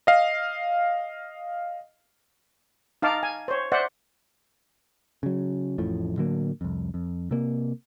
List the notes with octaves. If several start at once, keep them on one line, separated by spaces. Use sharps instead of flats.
D#5 F5
D#4 F5 A5 D6
G#5
C5 C#5
C5 D5 E5 F#5
C#3 F#3
A1 F2 A2 F3
A2 D3 F#3 A#3
C2 F2
F2
C3 A#3